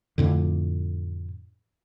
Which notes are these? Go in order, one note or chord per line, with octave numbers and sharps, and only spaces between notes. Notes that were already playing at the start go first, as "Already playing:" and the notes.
F2 A2 D3